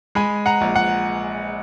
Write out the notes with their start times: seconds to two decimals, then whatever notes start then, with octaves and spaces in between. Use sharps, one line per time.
0.15 G#3 G#5 B5
0.46 F#5 A#5
0.61 A#1
0.76 F#5